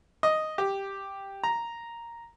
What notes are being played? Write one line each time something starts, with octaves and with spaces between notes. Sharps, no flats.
D#5
G4
A#5